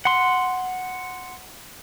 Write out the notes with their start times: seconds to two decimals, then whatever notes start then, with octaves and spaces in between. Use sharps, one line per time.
0.05 F#5 C6